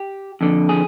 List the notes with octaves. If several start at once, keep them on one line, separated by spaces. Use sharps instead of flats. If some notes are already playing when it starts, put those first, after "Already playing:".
Already playing: G4
F2 D3
G#4